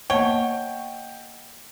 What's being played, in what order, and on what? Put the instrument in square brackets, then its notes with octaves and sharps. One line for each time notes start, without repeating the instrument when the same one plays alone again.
[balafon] A#3 B3 [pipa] C#5 [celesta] D#5 F#5 A5 [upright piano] G5 G7